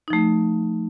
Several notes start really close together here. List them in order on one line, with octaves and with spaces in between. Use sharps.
D#4 F3 A3